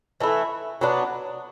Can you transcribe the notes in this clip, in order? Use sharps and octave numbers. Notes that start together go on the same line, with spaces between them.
E3 A3 E4
F#3 B3 D4